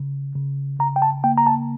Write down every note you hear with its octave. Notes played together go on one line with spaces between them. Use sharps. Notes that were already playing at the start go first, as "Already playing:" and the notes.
Already playing: C#3
C#3
C#3 A#5
G5
A5
A#3 G5
A#5
A5